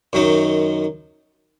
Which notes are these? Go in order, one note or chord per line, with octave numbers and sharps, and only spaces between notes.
F#2 D#3 F#3 D#4